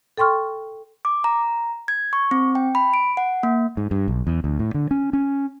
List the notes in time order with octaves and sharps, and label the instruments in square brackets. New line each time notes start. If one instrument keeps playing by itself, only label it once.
[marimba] A4 G5 C6 C#6 F6
[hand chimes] D6
A#5
G#6
C#6
C4
G5
B5
D7
F#5
A#3
[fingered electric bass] G#2
G2
B1
E2
D2
A2
D3
C#4
C#4